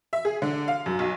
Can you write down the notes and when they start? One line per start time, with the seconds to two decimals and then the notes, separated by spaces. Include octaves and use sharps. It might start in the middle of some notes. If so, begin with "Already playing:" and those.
0.13 E5
0.25 G#4
0.42 D3
0.68 F5
0.86 F#2
0.99 B1